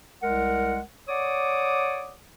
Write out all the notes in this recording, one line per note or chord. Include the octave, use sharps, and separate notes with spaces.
C2 G#3 A#4 F#5
C#5 D5 F#5 D6 D#6